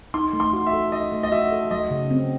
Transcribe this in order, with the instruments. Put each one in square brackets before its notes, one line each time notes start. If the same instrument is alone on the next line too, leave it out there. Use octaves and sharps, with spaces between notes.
[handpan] D#4 [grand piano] C6
[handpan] A3
[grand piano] C6
[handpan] F#4
[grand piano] E5
[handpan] A4
[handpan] D#4 [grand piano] D#5
[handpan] A3
[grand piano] D#5
[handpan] F#4 [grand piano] E5
[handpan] A4
[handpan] F#3 [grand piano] D#5
[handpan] C#3
C4